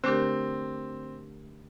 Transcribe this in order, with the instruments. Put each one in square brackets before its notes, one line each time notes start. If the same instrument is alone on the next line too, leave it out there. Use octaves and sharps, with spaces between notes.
[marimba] D3 A3 D4 G4 A#4 [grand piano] C4